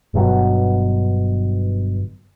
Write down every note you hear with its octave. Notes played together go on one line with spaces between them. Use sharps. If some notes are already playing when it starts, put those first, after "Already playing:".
G1 G2 B2 F#3